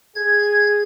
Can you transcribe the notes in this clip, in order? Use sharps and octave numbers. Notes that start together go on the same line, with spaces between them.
G#4 G#6